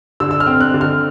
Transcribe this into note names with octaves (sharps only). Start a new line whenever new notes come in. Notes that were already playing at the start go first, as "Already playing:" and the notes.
D3 E6
E6
F6
C4
F#6
D3
F6